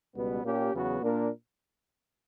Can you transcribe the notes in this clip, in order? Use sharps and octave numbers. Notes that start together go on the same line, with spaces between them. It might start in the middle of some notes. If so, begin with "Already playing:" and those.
C#2 B2 G3 B3
A#2 A#3 C#4 G4
E2 C#3 F#3 B3 F#4
A#2 A#3 D4 A#4